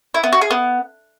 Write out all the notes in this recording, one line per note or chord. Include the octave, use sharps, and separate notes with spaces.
E4
B3
F#4
G#4
B3